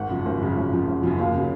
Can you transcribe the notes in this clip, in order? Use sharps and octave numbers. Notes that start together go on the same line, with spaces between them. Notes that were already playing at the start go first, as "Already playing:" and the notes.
Already playing: G#1 F#5
F#2 C#3 F3
G#1
F#2 C#3 F3
G#1
F#2 C#3 F3
G#1
F#2 C#3 F3
D#2 F5
C#3 F#3